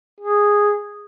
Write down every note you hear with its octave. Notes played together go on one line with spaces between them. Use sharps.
G#4